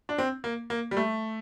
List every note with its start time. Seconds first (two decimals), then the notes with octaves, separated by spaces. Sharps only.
0.09 D4
0.18 C4
0.44 A#3
0.70 A#3
0.91 G3
0.97 A3